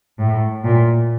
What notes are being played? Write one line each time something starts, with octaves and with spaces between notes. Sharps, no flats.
A2
A#2